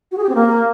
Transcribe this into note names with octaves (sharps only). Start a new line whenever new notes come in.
F#4
G#4
G4
C4
A#3